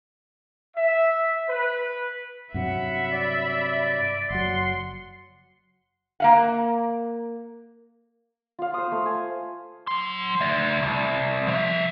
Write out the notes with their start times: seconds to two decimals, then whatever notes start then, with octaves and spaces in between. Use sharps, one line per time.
0.77 E5
1.48 B4
2.54 G2 C3 F#3 E5 F#5 B5
3.10 D5
3.44 D5
4.30 F#1 F#3 F#5 C6
6.20 A#3 F5 F#5
8.59 F4 F5
8.74 C5 D#6
8.92 A3
9.06 G#5
9.87 F#3 C6
10.41 A3 D5
10.82 C2
11.48 F3 E5